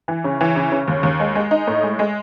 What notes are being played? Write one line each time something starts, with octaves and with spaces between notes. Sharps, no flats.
E3
C#3
E3
C#3
C#3
D#2
D#2
G#3
G#3
D#4
A2
G#3
G#3